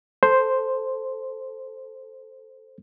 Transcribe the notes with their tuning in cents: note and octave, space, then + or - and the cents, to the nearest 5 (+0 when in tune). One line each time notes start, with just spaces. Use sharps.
A4 +0 C5 +0